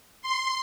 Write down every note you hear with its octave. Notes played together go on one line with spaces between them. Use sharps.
C6